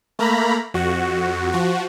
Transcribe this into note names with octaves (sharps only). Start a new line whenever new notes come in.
A3 A#3 A#5 B5
F2 F#4
F3 F#4